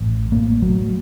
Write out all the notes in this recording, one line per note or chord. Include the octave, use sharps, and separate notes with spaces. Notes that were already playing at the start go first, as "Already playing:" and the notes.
A1
A1 A#3
A2 F#3